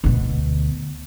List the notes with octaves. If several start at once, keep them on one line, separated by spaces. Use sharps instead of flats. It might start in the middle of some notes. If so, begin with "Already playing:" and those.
D2 B2